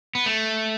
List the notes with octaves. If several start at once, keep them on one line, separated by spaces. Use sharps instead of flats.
B3
A3